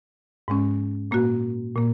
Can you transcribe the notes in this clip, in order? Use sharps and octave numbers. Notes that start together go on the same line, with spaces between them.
G#2 G#3 C#4
A#2 A#3 F#4
A#2 A#3